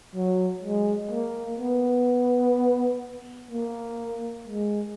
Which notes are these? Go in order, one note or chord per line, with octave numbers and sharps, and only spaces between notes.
F#3
G#3
A#3
B3
A#3
G#3